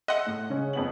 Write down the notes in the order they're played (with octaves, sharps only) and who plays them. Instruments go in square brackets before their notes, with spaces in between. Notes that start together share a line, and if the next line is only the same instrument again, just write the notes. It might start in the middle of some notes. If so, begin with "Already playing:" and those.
[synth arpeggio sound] D#5 F#5 [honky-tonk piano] E5 C6 F#6
[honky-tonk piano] A2
C#3 G#3 C#4
F2 B3 F#7